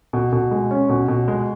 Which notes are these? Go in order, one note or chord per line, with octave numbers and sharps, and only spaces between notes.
B2
B2
G#3
C#4
B2
B2
G#3